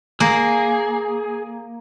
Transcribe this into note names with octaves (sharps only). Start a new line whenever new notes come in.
A#3 G#4